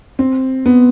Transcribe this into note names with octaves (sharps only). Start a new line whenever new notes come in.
C4
B3